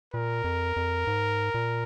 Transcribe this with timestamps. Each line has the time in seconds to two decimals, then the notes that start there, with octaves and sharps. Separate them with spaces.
0.14 A#2 A#4
0.44 F2
0.76 F2
1.07 G#2
1.54 A#2